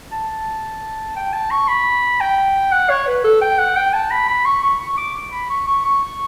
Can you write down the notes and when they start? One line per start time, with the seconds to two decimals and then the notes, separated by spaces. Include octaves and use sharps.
0.12 A5
1.16 G5
1.33 A5
1.51 C#6
1.68 B5
2.20 G5
2.72 F#5
2.90 C#5
3.07 B4
3.24 A4
3.41 G5
3.59 F#5
3.76 G5
3.94 A5
4.11 B5
4.28 B5
4.45 C#6
4.63 C#6
4.80 C#6
4.97 D6
5.32 B5
5.50 C#6
5.67 C#6
5.84 C#6